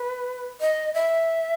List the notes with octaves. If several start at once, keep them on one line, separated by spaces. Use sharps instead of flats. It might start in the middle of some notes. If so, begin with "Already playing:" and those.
Already playing: B4
D#5
E5